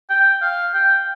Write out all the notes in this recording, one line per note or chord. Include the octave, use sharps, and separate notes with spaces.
G5
F5
G5